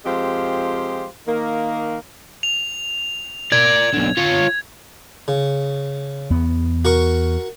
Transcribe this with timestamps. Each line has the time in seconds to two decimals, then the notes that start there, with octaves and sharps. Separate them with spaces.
0.06 F2 G#3 F4 G4 C5
1.27 D#3 A#3
2.43 F7
3.52 A#4 D5 G#6
3.93 B1 D3
4.17 F4 C#5
5.28 C#3
6.30 E2 B3
6.85 F#4 A#4 C#6